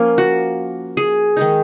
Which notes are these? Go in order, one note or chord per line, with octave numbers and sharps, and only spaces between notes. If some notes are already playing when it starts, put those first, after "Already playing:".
Already playing: F3 A#3 C#4
F#4
G#4
D#3 G#3 D#4